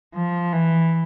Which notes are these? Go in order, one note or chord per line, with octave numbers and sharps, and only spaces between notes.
F3
E3